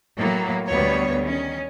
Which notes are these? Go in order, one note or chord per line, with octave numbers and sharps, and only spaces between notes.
A2 F#3 A#3
D2 G3 B3 C#5
D#3 C#4